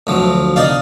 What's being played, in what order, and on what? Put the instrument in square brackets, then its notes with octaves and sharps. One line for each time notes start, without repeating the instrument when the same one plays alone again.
[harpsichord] D2 F3 F#3
D#4 D5 F5